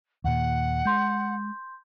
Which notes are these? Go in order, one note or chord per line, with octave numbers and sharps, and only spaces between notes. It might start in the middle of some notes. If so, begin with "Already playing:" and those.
D#2 A#2 F#5
G#3 C6 G6